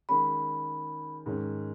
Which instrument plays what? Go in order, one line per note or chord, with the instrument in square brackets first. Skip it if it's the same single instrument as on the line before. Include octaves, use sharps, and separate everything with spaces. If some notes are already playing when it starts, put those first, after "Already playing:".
[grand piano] D#3 G#3 C#4 [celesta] B5
[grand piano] G#2 D#3 G#3 C#4